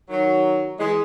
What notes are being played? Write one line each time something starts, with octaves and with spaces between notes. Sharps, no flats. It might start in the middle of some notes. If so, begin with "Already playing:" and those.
D#3 F#3
E3 G#3